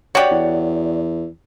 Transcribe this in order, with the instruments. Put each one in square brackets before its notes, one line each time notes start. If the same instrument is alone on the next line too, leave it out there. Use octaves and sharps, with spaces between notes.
[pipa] F#4 G4 [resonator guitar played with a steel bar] C#5 D5
[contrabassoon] E2